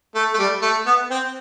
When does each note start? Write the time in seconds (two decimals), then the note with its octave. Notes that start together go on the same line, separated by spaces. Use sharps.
0.15 A3
0.34 A3
0.39 G3
0.62 A3
0.86 B3
1.11 C4